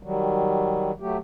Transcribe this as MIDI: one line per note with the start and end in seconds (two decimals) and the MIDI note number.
0.03 0.92 51
0.03 0.92 54
0.03 0.92 55
1.00 1.18 54
1.00 1.18 57
1.00 1.18 67